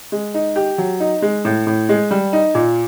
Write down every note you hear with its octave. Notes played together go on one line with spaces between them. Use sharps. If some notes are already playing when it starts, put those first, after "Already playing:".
G#3
D#4
G4
F#3
D#4
G#3
A2
A2
G#3
G3
D#4
A#2